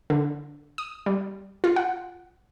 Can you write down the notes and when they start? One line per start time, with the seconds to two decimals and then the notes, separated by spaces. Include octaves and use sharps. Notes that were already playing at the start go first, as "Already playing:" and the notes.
0.10 D3
0.78 D#6
1.06 G3
1.64 F4
1.76 F#5